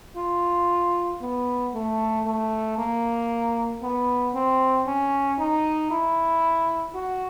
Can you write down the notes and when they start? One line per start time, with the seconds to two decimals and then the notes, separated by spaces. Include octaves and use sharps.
0.17 F4
1.21 B3
1.74 A3
2.26 A3
2.78 A#3
3.83 B3
4.35 C4
4.87 C#4
5.39 D#4
5.91 E4
6.95 F#4